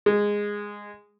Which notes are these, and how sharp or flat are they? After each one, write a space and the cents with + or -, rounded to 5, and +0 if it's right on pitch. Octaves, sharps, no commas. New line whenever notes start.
G#3 -10